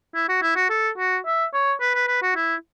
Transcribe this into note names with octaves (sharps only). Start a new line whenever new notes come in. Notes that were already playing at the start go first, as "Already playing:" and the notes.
E4
F#4
E4
F#4
A4
F#4
E5
C#5
B4
B4
B4
F#4
E4